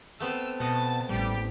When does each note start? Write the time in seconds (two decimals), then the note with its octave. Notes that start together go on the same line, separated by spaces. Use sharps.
0.20 A3 B3 C4 E6
0.60 B2 D#5 F#5 A5
1.09 A1 G3 G4